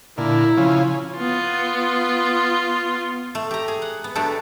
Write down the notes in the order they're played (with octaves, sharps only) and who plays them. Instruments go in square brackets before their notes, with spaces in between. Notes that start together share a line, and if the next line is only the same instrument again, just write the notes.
[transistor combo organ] A#2 D3 [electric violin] E4
[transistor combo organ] C#3 F3
[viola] B3 F4
[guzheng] A3
G4 A#5
G#4
F#5
B3
F#3 A3 B3 D4 G4 A4